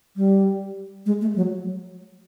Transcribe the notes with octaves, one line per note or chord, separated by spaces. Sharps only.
G3
G#3
A3
F#3